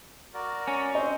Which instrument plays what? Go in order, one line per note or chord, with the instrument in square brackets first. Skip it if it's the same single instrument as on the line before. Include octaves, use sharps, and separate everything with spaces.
[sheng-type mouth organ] F#4 A#4 D5
[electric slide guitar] C#4
[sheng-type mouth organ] C4 C5 [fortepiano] D#5